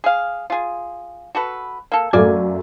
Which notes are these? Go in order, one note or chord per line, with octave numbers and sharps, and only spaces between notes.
G#4 F5
F4 G#4
F#4 A4 B4
A#3 A4
F#2 A3 A#3 D5 G#5